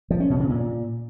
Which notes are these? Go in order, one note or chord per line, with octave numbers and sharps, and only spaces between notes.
F3
C#4
B2
C#3
A#2